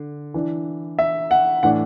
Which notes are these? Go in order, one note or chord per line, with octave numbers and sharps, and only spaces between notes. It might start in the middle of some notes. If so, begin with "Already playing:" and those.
Already playing: D3
E3 D4
E5
F#5
A2 E3 D4 F#5